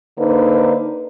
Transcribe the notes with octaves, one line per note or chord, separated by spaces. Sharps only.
D3 A#3 D#4 B4 C5